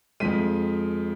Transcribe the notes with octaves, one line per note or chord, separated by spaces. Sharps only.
F2 F3 G#3 B6 D#7